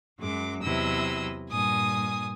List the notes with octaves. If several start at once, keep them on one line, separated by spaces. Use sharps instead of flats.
F#2 F#3 G#3 D6
E2 C3 F#3 E4 D#5 E6
G2 A#2 G#5 D#6